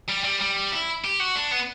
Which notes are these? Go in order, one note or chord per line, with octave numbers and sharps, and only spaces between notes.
G3
G3
G3
E4
G4
F#4
D4
B3